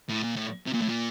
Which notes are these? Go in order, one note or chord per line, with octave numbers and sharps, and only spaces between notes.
A2
A#2
A2
C3
A#2
A2
A#2